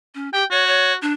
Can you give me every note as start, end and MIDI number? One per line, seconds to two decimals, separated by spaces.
0.15 0.29 61
0.33 0.44 67
0.33 0.45 79
0.51 0.95 66
0.51 0.64 73
0.67 0.93 73
1.02 1.13 62